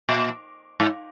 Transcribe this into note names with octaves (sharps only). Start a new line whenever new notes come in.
A#2
G#2